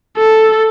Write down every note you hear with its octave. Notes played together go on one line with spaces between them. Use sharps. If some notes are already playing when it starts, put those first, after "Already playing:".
A4